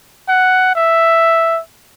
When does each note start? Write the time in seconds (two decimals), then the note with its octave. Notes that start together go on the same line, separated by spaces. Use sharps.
0.29 F#5
0.75 E5